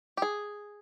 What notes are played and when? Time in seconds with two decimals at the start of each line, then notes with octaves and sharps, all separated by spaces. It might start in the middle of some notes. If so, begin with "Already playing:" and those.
0.17 G4
0.22 G#4